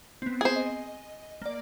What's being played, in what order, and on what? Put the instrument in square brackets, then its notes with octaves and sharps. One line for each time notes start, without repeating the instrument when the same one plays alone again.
[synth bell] B3 C4
[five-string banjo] G#4 C5
[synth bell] D#5
A#3 D5